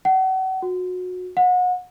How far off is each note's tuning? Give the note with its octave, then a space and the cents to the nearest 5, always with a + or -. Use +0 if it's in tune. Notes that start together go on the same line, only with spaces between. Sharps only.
F#5 +35
F#4 -25
F#5 -30